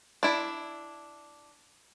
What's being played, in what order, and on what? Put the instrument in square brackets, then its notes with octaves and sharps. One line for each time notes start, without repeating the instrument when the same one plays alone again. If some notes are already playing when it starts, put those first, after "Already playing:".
[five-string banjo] D4 E4